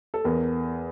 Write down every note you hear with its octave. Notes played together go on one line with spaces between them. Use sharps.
A4
E2 A#4